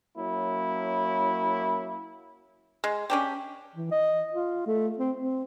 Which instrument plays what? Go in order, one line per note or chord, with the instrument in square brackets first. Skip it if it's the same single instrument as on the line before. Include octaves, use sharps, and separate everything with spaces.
[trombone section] F#3 A#3 C#4 E4
[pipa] G#3
C#4 D4 G4
[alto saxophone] E3
D#5
F4
A3
C4
C4